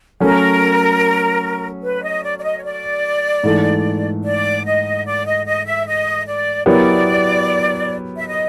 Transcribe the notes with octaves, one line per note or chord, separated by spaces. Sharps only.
F#3 A3 C#4 A#4
B4
D#5
D5
D5
D#5
C#5
D5
G#2 E3 A3
D5
D#5
D5
D#5
D#5
E5
D#5
D5
F#3 B3 E4 G4 A#4 D5
E5
D#5